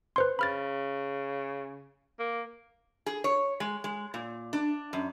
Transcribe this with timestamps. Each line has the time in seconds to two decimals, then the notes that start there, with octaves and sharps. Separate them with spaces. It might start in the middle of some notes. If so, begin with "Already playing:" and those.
0.16 B4 C5 C6
0.39 C#3 B5 F6 A6
2.19 A#3
3.06 G#4
3.24 C#5
3.60 G#3
3.84 G#3
4.14 A#2
4.53 D4
4.93 F#2